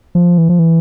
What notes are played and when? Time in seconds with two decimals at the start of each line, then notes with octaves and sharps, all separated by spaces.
0.15 F3
0.38 E3
0.49 F3
0.59 E3